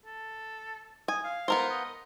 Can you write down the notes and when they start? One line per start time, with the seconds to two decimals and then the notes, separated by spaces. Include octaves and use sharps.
0.06 A4
1.08 G#5 D#6
1.24 F5
1.48 B3 A#4 C5
1.70 D#5